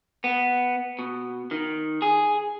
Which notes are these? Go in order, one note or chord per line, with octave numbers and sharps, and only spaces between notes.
B3
B2
D#3
G#4